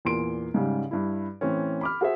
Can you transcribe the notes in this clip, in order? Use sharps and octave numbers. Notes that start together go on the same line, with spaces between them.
E2 A#2 C6 D7
G#2 C#3 G3
G2 E4
A2 E3 C4 C#4
B5 D6 F6
F#4 G#4 C5 E5